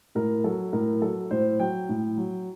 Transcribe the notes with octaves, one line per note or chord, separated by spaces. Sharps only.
A2 A#4
F#3 A4
A2 A#4
F#3 A4
A2 C5
F#3 G5
A2
F#3